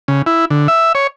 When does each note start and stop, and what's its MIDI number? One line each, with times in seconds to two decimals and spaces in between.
0.08 0.22 49
0.26 0.45 64
0.50 0.68 50
0.68 0.92 76
0.95 1.07 73